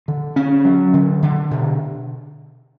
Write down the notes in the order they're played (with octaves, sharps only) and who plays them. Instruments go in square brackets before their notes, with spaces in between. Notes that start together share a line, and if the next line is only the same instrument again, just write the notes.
[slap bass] D3
C#4
F#3
D3
D3
B2